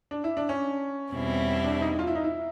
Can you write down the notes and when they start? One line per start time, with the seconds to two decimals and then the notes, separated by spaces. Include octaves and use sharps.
0.11 D4
0.24 E4
0.37 D4
0.49 C#4
1.13 E2 B2 G3 C4 E4
1.64 D4
1.81 D#4
1.99 F4
2.07 E4
2.15 D#4
2.24 E4